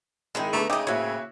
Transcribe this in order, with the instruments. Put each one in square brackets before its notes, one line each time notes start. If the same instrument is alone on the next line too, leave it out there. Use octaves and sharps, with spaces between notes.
[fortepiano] G#1 D#3 [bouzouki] G#3 D#4 E4
[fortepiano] D3 [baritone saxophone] A3 [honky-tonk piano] B3 A#5 C#6
[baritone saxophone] C#3 [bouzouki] A3 D#5 [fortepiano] D#4 [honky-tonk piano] G5 D6 D#6
[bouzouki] A2 C4 [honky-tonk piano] A#3 E5 [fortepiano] E4 F#4 C#5